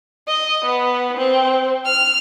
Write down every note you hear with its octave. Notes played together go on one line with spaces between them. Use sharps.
D#5
B3
C4
F6